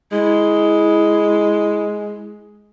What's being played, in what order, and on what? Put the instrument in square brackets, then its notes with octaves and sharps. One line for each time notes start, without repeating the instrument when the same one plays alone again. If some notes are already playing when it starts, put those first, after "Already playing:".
[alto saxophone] G#3 [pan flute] E4